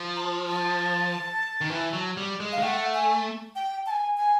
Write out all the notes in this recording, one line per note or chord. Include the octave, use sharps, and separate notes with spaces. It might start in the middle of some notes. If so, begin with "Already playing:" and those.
Already playing: F3
A#5
A5
A5
D#3
E3
F#3
G3
G#3
F5
G#3
A3 F#5 G5
G#5
G5
A5
G#5
G#5